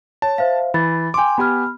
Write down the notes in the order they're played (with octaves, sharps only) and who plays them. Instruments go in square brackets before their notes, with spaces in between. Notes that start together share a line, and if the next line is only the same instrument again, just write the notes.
[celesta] C#5 [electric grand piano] A5
[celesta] C5 E5 F5
[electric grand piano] E3 [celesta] B5 A6
[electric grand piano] G5 D6 [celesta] G#5 C6
[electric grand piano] B3 G4 G#5 [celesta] B5 F6